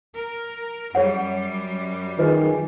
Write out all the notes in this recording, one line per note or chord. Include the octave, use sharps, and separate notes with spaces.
A#4
F#2 G3 G#4 C#5 F#5
D#3 F4 G#4 B4 D#5